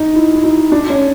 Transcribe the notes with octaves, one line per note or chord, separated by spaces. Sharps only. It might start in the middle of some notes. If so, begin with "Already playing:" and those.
Already playing: D#4
E4
E4
D#4
D4
C#4